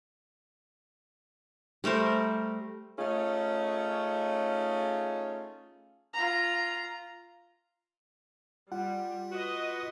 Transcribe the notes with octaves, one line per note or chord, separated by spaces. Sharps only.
G3 A3 A#4 C5
A3 C#4 D#4 F4 G#4
F4 A#5
G3 F4 F#5
F#4 B4 D#5